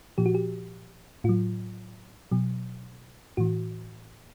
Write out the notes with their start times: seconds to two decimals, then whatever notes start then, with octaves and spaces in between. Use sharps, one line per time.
0.18 A#2 F3 G4
0.26 F#4
0.35 G4
1.24 A2 F#3 F4
2.31 B2 F#3
3.37 A2 E3 F#4